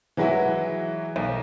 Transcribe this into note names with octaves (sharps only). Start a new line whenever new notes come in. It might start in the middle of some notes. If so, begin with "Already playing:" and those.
E3 F#3 G#3 E4 F#4
B1